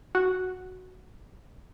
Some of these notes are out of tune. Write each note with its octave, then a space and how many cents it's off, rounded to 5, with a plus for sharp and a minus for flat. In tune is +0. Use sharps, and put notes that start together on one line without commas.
F#4 +0 F#5 +0